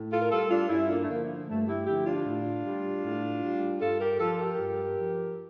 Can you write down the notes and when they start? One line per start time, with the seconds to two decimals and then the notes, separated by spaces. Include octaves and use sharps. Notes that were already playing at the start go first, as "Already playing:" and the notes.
Already playing: A2
0.11 F4 A4
0.22 A#4
0.31 G3 F4 A4
0.50 D4 F4
0.69 G2 C#4 E4
0.88 A#3 D4
1.03 A3
1.08 D3 F3 A#3
1.47 G2 A3
1.67 E4 G4
1.86 D3 F3 E4 G4
2.05 D4 F4
2.25 A2
2.63 G3
3.03 A2
3.42 G3
3.80 G2 F4 A4
4.00 G4 A#4
4.19 F3 F4 A4
4.38 G4 A#4
4.58 G2
4.96 F3